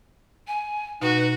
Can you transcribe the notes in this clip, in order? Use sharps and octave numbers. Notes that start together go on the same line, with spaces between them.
G#5
B2 D#4 F#4 B4